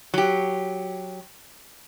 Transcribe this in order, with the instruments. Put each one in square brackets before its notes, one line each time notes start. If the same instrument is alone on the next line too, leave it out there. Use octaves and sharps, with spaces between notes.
[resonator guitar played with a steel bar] F#3 G4